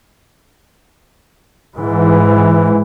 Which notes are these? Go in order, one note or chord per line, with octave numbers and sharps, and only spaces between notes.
G#2 E3